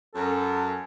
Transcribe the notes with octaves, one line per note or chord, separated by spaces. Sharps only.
F#2 A4